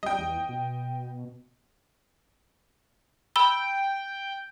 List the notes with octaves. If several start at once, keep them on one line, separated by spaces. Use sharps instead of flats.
G3 D#5 G5
E2
B2
G5 B5 E6 G7